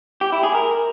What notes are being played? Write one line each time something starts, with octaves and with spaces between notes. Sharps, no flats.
G4
E4
G#4
A#4